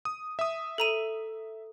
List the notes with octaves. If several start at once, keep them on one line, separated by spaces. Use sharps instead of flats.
D#6
E5 D#6
A4 A#5 D#7